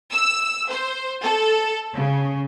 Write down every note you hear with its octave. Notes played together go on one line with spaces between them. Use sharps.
E6
C5
A4
C#3